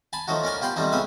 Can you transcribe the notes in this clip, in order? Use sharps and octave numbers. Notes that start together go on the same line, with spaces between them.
G#5 A5 B5
F3 F#3 A3 D#4 F#4
C#4 A#4 D5 G#5
F4 G4 G5 B5 C6
F3 G3 A3 C4 D#4
C#2 C#4 G#4 B4 E5